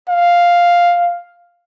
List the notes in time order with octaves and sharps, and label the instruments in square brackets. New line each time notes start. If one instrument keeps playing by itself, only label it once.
[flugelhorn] F5